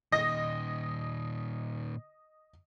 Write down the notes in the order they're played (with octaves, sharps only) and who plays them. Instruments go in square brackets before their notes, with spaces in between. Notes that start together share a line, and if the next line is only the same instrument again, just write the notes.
[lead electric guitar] A#2 D#3 [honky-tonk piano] D#5 A#6